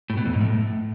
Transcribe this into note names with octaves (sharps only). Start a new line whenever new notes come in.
A2
B2
F2
G#2
A2